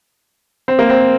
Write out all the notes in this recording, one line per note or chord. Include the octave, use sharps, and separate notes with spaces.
C4
A#3
C4